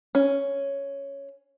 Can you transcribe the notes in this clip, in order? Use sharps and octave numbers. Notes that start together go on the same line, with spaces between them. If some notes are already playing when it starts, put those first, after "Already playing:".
C#4